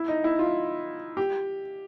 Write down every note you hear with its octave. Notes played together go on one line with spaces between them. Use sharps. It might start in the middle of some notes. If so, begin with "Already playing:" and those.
Already playing: E4
D#4
E4
F4
G4